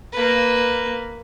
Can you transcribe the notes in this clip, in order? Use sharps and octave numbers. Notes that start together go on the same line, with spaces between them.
A#3 B4